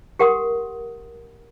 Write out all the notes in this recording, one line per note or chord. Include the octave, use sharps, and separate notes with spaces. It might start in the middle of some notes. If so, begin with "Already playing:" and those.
G4 A#4 F#5 C6 D#6